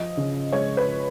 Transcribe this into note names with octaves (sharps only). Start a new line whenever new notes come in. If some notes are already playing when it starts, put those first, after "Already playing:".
Already playing: F3 D#5
C#3
G#3 C#5
B4